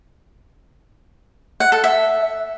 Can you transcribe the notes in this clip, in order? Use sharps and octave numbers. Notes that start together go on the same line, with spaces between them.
F#5
A4
E5